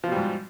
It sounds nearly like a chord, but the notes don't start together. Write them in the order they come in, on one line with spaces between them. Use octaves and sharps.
F3 B2 G3 G#2